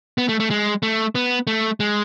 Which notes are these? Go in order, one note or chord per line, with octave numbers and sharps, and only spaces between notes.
B3
A3
A3
G#3
A3
B3
A3
G#3